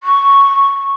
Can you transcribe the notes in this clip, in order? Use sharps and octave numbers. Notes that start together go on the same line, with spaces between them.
C#6